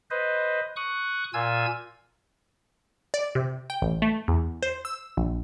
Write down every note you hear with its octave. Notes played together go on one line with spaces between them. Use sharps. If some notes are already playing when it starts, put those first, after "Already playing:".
B4 C5 D#5
C#6 D#6 F#6
A#2 F4 G#5 E6 G#6
D5
C3
G5
A1
A3
E2
C5
E6
A#1